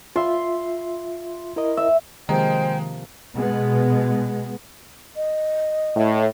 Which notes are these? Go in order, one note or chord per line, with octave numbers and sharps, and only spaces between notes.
F4 E5 C6
E4 A#4 D#5
E5
C3 D#3 F3 G#3 A#3 C5 G5
B2 G#3 B3
D#5
A2